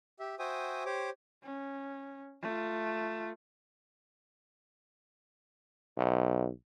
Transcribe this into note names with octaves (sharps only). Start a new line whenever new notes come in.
G4 E5
F#4 C5 E5 G5 G#5 D#6
G4 C5 C#5 D6
C#4
A3 F4
B1